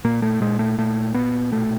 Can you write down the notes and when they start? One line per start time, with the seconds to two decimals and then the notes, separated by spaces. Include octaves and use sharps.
0.04 A#2 A#3
0.22 A3
0.40 A#2 G#3
0.59 A3
0.78 A#2 A3
1.14 A#2 B3
1.52 B2 A3